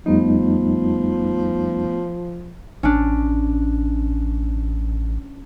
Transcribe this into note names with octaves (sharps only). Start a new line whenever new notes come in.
F2 F3 G3 A3 B3 D#4
A1 C#4 D4